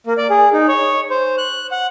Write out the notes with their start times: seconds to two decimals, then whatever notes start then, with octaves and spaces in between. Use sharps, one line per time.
0.07 A#3
0.18 D5
0.30 G#4
0.53 D#4
0.68 C#5
1.10 C5
1.38 F#6
1.72 F#5